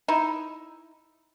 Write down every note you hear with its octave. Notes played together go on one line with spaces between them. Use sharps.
D#4 E4